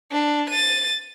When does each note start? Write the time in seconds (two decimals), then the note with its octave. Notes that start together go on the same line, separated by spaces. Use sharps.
0.12 D4
0.50 A6 D#7